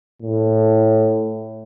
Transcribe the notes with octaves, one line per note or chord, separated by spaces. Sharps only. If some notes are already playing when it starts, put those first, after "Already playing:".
A2